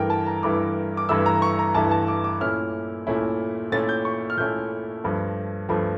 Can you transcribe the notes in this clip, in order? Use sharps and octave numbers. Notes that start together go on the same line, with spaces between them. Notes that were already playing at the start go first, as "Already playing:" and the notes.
Already playing: G2 E3 A3 E4 A#4 G5
A5
A#5
G2 E3 A3 E4 D6
D6
G2 E3 A3 E4 E6
A#5
C#6
A#5
G2 E3 A3 E4 A5
A5
D6
D6
A#2 A3 C#4 E4 F6
A#2 A3 C#4 E4
A#2 A3 C#4 E4 A6
G6
C#6
F6
A#2 A3 C#4 E4 G6
G2 F3 A3
G2 F3 A3